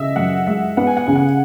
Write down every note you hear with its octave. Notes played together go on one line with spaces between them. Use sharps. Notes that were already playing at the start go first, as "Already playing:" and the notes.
Already playing: C#3 D#5 E5
F#2 F#5
G#3 E5
B3 F#5
G#5
F#5
C#3 G#5
F#5